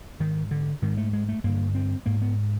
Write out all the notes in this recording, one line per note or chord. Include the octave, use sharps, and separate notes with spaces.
G#2 D#3
D3
G#2 D#3
A3
G#3
A3
G2 D3 A#3
C4
G#2 A#3
B3